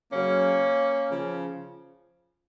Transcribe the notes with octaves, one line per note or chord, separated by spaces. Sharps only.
C#3 F#3 A#3 C#4
C#3 F3